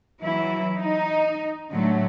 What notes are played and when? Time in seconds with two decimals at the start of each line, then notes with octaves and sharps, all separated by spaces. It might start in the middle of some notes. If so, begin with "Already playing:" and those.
0.23 E3 F#3 E4
0.78 D#4
1.72 A2 D3 F#3 A3